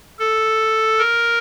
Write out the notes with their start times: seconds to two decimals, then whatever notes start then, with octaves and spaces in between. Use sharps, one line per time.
0.19 A4
0.98 A#4